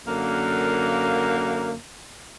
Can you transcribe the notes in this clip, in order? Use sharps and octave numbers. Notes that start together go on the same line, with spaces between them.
F#2 D3 A#3